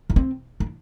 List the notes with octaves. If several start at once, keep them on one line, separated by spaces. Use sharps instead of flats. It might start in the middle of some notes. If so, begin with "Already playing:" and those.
D4
C4
D4